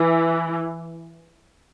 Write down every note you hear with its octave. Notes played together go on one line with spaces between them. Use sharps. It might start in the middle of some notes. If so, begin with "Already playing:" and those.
Already playing: E3